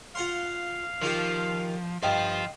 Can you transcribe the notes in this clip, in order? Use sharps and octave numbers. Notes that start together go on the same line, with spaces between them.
F4 F5 F#5 C6
D#3 F3 F4 G4
G2 F3 F4 D#5 F5 G5 D#6